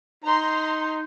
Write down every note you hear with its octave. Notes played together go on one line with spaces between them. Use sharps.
D#4 A#5 C6